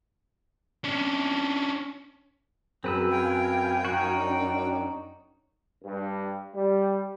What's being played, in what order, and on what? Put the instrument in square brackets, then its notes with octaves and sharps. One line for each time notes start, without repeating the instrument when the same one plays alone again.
[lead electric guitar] C#4 D4
[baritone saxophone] F#2 [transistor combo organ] F#3 G#4 A#4 [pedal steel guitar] C4 B4 E6
[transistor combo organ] F5 G#5 [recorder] G5
[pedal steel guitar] D#4 F#4
[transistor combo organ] C#4 D4
[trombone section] G2
G3